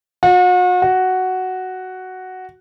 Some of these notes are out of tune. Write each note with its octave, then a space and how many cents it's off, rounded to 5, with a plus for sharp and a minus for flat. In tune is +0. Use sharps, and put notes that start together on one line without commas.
F#4 -40
F#4 +5